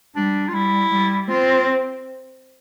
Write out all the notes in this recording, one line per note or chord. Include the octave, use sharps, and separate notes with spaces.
G3 D4
F4
G3 E4
G3
C4 F4